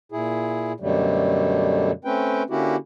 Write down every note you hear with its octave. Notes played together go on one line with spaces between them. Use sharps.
A#2 E4 G#4
F#2 B2 D3 F#3 G3 A3
A3 C4 C#4 B4 G5
D3 A#3 C#4 E4 F#4 G4